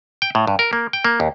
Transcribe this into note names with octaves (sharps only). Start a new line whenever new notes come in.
G5
A2
G2
A#4
A#3
G5
A#3
D#2